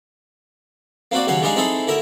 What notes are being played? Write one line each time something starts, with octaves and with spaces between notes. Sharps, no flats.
A#3 C4 F#4 D5
D#2 C#3 F#3 F5 F#5
G3 G#3 D4 D#4 G#4 F5
C4 D#4 E4 G#4 A4 B5
D2 E4 A#4 E5